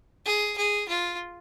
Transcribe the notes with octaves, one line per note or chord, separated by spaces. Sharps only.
G#4
G#4
F4